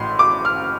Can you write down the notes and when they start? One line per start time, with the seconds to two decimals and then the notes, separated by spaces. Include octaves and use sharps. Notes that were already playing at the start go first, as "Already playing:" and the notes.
Already playing: A1 A2 C6
0.19 D6
0.45 F6